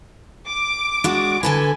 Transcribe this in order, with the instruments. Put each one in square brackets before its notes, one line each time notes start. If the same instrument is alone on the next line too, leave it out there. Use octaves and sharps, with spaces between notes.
[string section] D6
[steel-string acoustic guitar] G#3 D4 F#4
[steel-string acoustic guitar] D3 A4 B4 [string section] G#5